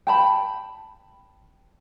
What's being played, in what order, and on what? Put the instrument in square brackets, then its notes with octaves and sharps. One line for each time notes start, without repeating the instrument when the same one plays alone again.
[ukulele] G5 A5 B5